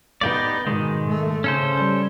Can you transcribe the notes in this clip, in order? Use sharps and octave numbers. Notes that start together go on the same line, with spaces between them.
B3 D#4 G4 D5
G#2 B2 D#3 G#3
A3
C#3 C#4 A4 C5
G3